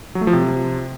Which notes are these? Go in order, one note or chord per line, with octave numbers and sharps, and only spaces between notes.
F#3
A3
F3
C3